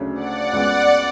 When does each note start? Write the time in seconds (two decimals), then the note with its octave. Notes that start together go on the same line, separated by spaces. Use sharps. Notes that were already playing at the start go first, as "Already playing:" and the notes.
Already playing: D2 C#3 F#3 A3 D4
0.15 D5 F#5
0.53 C#2 C#3 G#3 B3